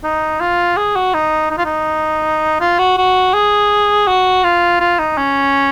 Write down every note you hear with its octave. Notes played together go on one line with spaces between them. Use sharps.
D#4
F4
G#4
F#4
D#4
D#4
F4
D#4
F4
F#4
F#4
G#4
F#4
F4
F4
D#4
C#4